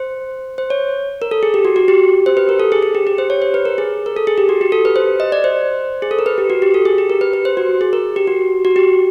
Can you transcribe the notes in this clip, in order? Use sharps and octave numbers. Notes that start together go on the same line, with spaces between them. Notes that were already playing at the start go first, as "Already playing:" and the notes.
Already playing: C5
C5
C#5
A#4
A4
G#4
G4
F#4
F#4
G4
C5
B4
A#4
A4
G#4
G#4
G4
G4
C5
C#5
C5
B4
A#4
G#4
A#4
A4
G#4
G4
F#4
G4
A4
B4
C5
D#5
D5
C5
G#4
A4
A#4
B4
G4
F#4
G4
A4
G#4
G4
A#4
B4
B4
C5
F#4
G#4
A#4
G4
F#4
F#4
G4